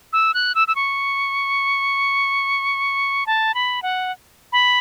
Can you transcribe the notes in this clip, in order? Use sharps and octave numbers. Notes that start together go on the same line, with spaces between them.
E6
F#6
E6
E6
C#6
A5
B5
F#5
B5